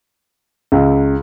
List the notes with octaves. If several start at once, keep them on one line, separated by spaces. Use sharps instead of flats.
C#2